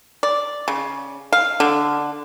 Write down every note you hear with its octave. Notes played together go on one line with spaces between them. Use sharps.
D5
C#3
F5
D3